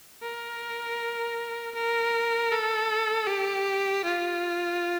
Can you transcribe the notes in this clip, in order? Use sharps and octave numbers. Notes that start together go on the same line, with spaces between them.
A#4
A#4
A4
G4
F4